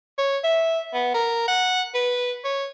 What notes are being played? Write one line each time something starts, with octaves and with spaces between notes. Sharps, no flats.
C#5
E5
B3
A#4
F#5
B4
C#5